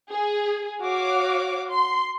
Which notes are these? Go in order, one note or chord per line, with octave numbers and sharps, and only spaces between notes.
G#4
F#4 C#5 F5 D6
C6